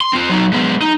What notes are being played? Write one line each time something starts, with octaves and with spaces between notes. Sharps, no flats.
C6
C4 F4
F#3 D#4
G#3 B3
D#4